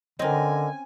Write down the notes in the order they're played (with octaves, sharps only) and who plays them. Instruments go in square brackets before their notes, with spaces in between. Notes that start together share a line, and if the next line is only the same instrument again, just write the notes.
[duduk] D3 [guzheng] C4 C#4 [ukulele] A#4 C5 D#5 [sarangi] G#5